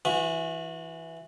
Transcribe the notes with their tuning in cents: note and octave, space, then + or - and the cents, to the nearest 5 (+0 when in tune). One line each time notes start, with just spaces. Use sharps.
E3 +0 F#4 -30